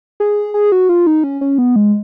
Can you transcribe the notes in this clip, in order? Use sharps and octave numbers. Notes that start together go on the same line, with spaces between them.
G#4
G#4
F#4
F4
D#4
C#4
C#4
B3
G#3